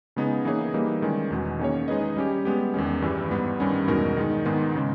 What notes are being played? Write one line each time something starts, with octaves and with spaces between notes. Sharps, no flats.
C#3 G#3 B3 D#4 G#4
E3 A#3 D#4 G#4 C#5
E3 G3 A#3 D#4
D#3 G#3 C#4
E2 B2 G#3
D#3 A#3 C#4 G#4 C#5
G#3 D#4 G#4 B4 D#5
G3 C#4 G4
G#3 B3 G4
E2 D#3 G#3 C#4
G2 E3 G3
G#2 G3 B3
G2 D#3 G3 C#4
E2 B2 G#3 D#4 A#4
D#3 G#3 D#4
G#2 D#3 G#3 B3 D#4
C#3 G#3